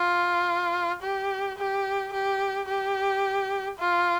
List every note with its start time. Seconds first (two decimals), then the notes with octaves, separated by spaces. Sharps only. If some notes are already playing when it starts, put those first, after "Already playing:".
Already playing: F4
1.02 G4
1.58 G4
2.13 G4
2.68 G4
3.79 F4